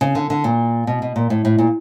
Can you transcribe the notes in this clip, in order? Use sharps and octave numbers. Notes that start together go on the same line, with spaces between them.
C#3
D3
D3
A#2
B2
B2
A#2
A2
A2
A#2